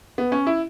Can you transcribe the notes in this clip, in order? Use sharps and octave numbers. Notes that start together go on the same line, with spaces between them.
B3
C#4
E4